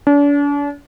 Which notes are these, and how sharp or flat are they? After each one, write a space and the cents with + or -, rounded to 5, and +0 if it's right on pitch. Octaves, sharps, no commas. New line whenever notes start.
D4 -40